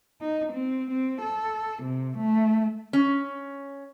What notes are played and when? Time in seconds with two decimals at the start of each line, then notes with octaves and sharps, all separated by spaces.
0.21 D#4
0.53 C4
0.91 C4
1.21 A4
1.83 C3
2.17 A3
2.93 C#4